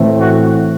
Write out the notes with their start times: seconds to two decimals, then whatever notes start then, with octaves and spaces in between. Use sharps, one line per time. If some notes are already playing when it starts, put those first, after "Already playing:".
Already playing: A2 E3 A3 C4
0.18 F#4